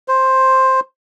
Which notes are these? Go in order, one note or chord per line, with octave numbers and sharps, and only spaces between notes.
C5